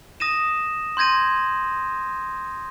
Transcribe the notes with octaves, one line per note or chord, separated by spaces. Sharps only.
D#6 A#6 D#7 E7
C6 G6 G#6 A#6 D#7